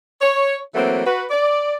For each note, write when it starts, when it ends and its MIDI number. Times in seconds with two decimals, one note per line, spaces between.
0.20 0.56 73
0.75 1.02 52
0.75 1.02 54
0.75 1.02 57
0.75 1.02 58
0.75 1.02 60
1.05 1.24 66
1.05 1.24 71
1.30 1.75 74